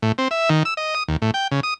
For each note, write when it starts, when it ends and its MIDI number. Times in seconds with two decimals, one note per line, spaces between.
0.03 0.12 45
0.18 0.28 60
0.31 0.49 76
0.50 0.63 51
0.65 0.74 88
0.77 0.94 75
0.95 1.03 87
1.08 1.17 39
1.22 1.31 45
1.34 1.48 79
1.51 1.60 49
1.63 1.74 87